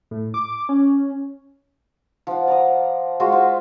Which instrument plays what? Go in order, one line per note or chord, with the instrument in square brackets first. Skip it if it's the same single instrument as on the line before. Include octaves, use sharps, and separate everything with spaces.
[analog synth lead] A2
D6
C#4
[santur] F3 F#5
D5 A#5 D#6
G#3 F4 F#4 C5
F4 C5 E5